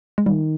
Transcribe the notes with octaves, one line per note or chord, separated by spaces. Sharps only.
G#3
D#3 G3